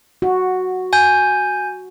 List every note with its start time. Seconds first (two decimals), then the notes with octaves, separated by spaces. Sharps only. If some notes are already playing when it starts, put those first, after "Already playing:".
0.22 F#4
0.93 G#5 G6